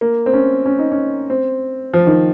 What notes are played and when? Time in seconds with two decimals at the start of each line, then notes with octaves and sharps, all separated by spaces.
0.01 A#3
0.26 C4
0.33 C#4
0.66 C#4
0.79 D#4
0.92 C#4
1.30 C4
1.94 F3
2.07 D#3